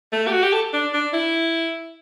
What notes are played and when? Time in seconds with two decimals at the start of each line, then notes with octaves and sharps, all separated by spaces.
0.13 A3
0.27 G4
0.32 F#4
0.42 G4
0.52 A4
0.73 D4
0.93 D4
1.13 E4